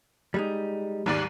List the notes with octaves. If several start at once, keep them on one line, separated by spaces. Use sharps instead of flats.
G3 G#3 D#4
D#2 G#2 G3 D5